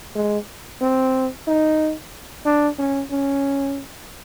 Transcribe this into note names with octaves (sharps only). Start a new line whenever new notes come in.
G#3
C4
D#4
D4
C#4
C#4